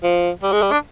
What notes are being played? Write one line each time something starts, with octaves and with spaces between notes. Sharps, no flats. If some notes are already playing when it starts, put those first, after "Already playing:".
F3
G3
G#3
G3
D4